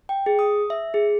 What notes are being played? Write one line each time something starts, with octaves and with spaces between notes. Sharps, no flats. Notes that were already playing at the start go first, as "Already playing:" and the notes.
G5
G#4
D#6
E5
G#4